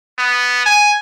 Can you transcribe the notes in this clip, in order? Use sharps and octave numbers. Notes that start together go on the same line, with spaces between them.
B3
G#5